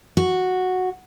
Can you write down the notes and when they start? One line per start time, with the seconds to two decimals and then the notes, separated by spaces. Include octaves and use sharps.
0.17 F#4